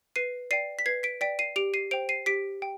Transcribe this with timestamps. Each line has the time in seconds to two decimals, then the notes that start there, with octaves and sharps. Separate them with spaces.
0.16 B4 C7 D#7
0.51 D5 G5 C7 D#7
0.79 B6
0.86 B4 G#6 C7
1.03 B6 D7
1.21 D5 G5 B6 D7
1.39 C7 D#7
1.56 G4 D7 F7
1.74 C7 D#7
1.91 C5 G5 D7 F7
2.09 C7 D#7
2.26 G4 B6 D7
2.62 G5